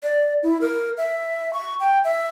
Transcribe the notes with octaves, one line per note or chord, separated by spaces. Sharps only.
D5
E4
A#4
E5
C#6
G5
E5